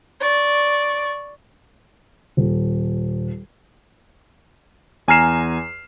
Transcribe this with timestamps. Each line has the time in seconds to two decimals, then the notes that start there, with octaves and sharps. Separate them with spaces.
0.20 D5 C#6
2.37 D#1
5.08 E2 G#5 A#5 F6 C7 E7